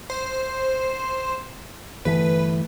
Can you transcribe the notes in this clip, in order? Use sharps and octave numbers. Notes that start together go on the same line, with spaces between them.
C5
G1 E3 A3 B4